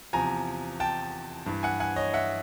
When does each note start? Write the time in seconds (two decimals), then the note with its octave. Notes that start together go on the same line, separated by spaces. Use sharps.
0.13 E2 C3 F3 G#5 A#5
0.80 G5 A5
1.46 G2 E3
1.63 F#5 G#5
1.80 F#5 G#5
1.96 C#5 D#5
2.13 E5 F#5